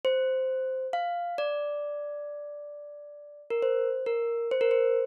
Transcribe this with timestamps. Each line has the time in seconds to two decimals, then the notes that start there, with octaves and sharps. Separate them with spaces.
0.05 C5
0.93 F5
1.38 D5
3.50 A#4
3.62 C5
4.06 A#4
4.51 C5
4.61 A#4
4.71 C5